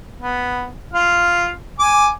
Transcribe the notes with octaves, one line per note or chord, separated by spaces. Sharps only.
B3
F4 F5
G#5 D6